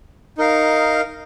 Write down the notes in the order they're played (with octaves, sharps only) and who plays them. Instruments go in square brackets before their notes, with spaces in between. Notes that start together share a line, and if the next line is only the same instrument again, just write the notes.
[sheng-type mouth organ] D#4 A#4 F5